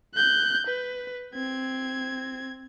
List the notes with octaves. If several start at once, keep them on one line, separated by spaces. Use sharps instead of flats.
F#6 G6
B4
C4 G#6